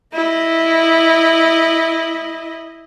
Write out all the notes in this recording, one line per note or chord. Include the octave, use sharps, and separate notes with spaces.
E4 D#5